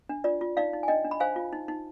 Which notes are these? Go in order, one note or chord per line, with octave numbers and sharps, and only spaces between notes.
D4
F4 D5
F4
D#4 D5 F5
D#4
G#5
D4 D#5 G5
D4
B5
C5 F5 G#5
F4
D#4
D#4